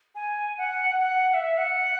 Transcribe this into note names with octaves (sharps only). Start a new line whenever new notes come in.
G#5
F#5
F#5
F#5
E5
F#5